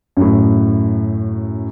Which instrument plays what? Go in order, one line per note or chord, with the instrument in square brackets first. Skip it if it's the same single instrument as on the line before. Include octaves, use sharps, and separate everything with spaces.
[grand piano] F#2 A2